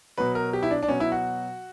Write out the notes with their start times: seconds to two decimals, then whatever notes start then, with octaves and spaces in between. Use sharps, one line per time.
0.18 B2 F#3 B4
0.35 A#4
0.53 G4
0.63 E4
0.71 D4
0.83 D4
0.88 B2 F#3 C#4
1.00 E4
1.12 F#4